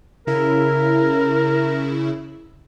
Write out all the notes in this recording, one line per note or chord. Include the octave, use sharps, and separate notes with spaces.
C#3 E4 A#4